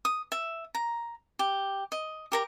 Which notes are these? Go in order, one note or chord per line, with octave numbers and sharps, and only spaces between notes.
D#6
E5
A#5
G4
D#5
G4 A#4 A#5